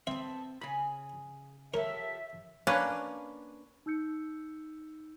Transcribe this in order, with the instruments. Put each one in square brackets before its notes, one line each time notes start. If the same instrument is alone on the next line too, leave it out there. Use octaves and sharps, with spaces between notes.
[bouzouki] B3 A4 [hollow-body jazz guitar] C4 [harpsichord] E5
[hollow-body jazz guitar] C#3 B5 [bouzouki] G#4 G#5
[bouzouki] F3 G4 A4 [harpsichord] A#4 [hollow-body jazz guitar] C#5 [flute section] E5
[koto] A#3 C#4 D4 B4
[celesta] D#4 E6 G6 C#7